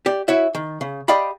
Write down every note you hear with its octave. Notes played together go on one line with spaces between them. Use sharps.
G4 D5
E4 F#4 C#5 E5
D#3
C#3
G4 D5 D#5 F5 G5 B5